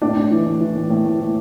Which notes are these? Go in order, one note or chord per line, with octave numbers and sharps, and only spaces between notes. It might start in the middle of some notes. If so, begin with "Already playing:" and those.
A2 D4
A2
E3
A2
E3
A2
A2
A2
A2